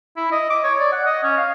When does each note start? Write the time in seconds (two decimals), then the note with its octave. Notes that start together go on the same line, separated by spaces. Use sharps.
0.17 E4
0.32 D#5
0.50 D6
0.64 C#5
0.79 D5
0.93 F#5
1.06 D#5
1.23 C#4
1.37 F5